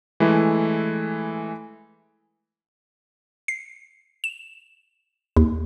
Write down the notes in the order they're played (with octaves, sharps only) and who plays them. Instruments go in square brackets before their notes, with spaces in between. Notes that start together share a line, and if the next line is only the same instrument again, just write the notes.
[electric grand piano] E3 G#3 A3 E4
[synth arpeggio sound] C7
E7
D#2